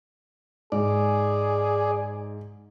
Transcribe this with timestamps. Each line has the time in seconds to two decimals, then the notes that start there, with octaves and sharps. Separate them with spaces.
0.72 G#2 G#4 D5